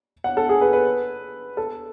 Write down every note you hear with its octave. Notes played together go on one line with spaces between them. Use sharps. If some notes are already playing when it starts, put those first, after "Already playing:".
F#5
A4
G#4
B4
B4
A4